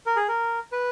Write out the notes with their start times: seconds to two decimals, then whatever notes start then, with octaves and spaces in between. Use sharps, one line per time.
0.06 A#4
0.16 G#4
0.28 A#4
0.72 B4